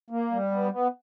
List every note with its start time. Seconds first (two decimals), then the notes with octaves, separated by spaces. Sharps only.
0.10 A#3
0.31 G3
0.51 B3
0.71 B3